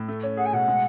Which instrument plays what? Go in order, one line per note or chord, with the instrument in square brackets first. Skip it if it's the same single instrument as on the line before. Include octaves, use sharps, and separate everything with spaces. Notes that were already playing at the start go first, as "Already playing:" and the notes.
Already playing: [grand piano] A2
A3
C#4
[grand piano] G#4 [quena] F#5
[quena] G#5
[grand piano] B2 [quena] F#5
[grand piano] G#3